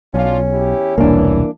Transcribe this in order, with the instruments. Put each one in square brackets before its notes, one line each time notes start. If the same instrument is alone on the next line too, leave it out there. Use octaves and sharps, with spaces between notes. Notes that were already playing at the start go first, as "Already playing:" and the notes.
[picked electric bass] B1 [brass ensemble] F#3 D4 F4 [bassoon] C#4
[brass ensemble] E2 E4 G4
[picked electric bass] E1 C2 [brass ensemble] E3 [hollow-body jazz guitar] A#3 D4